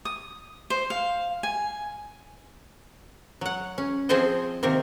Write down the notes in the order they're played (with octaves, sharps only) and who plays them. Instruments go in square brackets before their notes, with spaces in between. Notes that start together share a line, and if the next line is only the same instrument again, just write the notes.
[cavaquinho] D#6
C5
F5
G#5
[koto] F#3 F#5
C#4
F3 C4 G#4 A4 C5 D#5
C3 D#3 A#3 C4